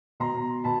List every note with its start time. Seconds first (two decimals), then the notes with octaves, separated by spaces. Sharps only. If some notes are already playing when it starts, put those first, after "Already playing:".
0.20 B2 A#5 C6
0.64 B2 A5 B5